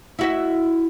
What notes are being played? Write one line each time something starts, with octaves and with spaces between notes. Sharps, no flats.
E4 F#4 E5